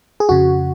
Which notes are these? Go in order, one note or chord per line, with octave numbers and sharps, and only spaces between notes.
G#4
F2 C#3 F#4